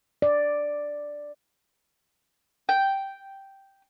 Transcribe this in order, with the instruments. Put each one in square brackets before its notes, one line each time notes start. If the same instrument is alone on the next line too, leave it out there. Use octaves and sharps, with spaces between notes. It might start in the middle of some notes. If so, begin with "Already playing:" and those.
[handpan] D5
[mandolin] G5